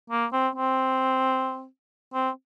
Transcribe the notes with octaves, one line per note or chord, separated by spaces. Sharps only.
A#3
C4
C4
C4